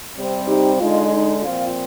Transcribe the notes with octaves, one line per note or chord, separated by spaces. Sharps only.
C3 G3 C4
D#4 G4
D3 G#3 D#4 F4
D#4
A#2 F3 C4 F4